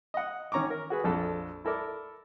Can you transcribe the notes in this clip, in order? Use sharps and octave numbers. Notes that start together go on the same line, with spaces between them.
D#5 F#5
D#3 C#4 A#5 C#6 D6
A#4
F#4 G#4 B4
A#1 F2 A4
E4 A4 A#4 D5